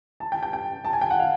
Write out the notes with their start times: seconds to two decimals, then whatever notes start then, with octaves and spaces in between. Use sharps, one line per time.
0.20 A5
0.32 G5
0.43 G5
0.53 G5
0.85 A5
0.93 G#5
1.01 G5
1.10 F#5
1.19 F5